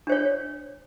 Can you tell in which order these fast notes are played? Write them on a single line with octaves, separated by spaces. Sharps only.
D4 C5 C#5